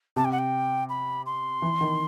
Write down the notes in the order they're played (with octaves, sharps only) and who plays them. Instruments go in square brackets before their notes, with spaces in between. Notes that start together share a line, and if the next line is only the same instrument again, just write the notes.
[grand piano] C3 [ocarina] A5
[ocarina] G5
F#5
G5
B5
C6
[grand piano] E3
D#3